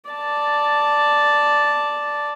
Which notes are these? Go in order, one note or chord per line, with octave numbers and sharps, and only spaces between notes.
D5 A5